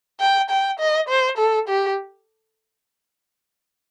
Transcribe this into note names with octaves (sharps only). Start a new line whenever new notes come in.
G5
G5
D#5
C5
A4
G4